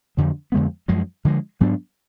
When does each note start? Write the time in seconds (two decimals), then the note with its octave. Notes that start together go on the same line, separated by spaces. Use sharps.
0.17 F2 D3 F#3
0.52 F2 D3 G#3 B3
0.88 F#2 F3 G#3
1.25 D3 F3 G#3
1.61 G#2 F#3 B3 D4